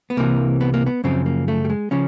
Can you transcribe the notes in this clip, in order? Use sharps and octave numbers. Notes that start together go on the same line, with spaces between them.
B3
C2 C3 E3 A#3
B3
A#3
B3
F#2 C#3 F3 C4
A#3
A3
G3
G#3
C#3 F3 C#4